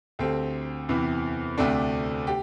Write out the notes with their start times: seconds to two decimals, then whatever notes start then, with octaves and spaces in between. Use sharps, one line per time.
0.19 D2 D3 C4 G4
0.89 E2 C3 E3
1.58 D2 C3 A3 D4
2.27 G4